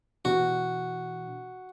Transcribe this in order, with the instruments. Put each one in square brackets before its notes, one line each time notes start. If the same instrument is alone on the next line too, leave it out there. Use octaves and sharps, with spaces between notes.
[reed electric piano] B2 E3 D4 [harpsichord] F#4